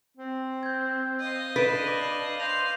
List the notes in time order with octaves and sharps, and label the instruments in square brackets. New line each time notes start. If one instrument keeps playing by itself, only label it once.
[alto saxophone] C4
[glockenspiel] G6 G#6
[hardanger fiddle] D#5 F5
[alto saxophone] D4 [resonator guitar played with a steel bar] B4 [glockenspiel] A6 D7 E7
[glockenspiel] D6 A#6 F#7
[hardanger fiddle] C5 F5 [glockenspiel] G6 A#6 F7